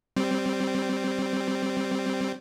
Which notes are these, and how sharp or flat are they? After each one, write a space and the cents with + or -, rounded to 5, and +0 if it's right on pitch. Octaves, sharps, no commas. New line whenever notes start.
G3 -10 C4 +0